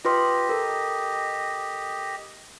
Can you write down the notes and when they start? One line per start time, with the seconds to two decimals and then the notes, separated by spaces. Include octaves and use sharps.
0.05 F4 G4 B4 D#5 C6
0.49 A4 A#4